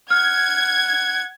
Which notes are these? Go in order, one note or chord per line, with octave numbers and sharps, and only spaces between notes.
F#5 F6 G#6